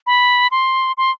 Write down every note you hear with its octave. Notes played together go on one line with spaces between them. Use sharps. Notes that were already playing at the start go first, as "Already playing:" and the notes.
B5
C6
C6